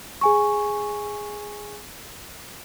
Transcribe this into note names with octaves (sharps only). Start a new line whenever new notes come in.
G#4 G#5 C#6